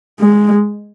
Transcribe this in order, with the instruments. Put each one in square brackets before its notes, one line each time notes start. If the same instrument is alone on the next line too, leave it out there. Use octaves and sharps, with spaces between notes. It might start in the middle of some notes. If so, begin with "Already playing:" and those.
[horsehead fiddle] G#3